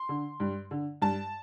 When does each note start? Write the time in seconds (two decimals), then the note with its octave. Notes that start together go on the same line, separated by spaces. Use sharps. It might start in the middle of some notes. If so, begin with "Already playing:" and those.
Already playing: C6
0.09 D3
0.40 G2
0.71 D3
1.02 G2 A5